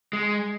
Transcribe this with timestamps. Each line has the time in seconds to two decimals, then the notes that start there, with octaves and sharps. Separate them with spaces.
0.13 G#3